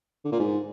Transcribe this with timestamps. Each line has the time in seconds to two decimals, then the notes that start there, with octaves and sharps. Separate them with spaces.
0.25 D3
0.32 A#2
0.39 G#2